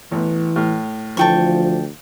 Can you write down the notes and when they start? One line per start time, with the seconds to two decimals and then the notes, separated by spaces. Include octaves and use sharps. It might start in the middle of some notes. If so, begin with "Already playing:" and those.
0.12 A1 E3 B3
0.56 A2 F6
1.17 D2 E3 F3 A4 G5 C#6